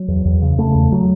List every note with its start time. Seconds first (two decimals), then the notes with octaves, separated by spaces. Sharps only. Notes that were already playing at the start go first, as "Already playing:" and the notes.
Already playing: F#3
0.08 E2
0.25 E2
0.42 C#3
0.58 C#3 A3
0.75 E2
0.92 F#3